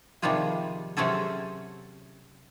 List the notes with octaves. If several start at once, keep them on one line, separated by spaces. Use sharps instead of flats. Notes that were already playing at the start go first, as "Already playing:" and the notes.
C3 D#3 F3 G3 F4 G#4
C3 F#3 C4 C#4 G#4 A4